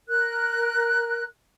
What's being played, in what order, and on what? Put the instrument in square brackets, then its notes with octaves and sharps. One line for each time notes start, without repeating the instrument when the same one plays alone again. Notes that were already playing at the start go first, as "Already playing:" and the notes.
[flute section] A#4 F#6